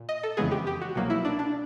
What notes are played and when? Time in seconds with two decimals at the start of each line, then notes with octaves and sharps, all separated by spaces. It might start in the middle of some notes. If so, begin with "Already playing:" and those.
Already playing: A#2
0.09 D#5
0.23 A4
0.37 F2 C#3 E3 G#3 B3 G#4
0.51 G4
0.67 G4
0.81 F#4
0.95 C2 B2 F#3 A#3
1.10 E4
1.25 D4
1.39 D4